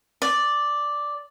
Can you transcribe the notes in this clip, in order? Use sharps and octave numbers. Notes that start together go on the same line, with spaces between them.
D5